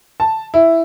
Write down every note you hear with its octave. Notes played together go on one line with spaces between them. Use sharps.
A5
E4